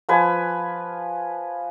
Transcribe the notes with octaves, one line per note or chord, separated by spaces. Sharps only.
F3 B4 G#5